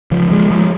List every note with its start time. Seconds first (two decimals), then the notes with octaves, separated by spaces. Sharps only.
0.11 C#3 F3
0.31 F3 G#3
0.51 F3 G#3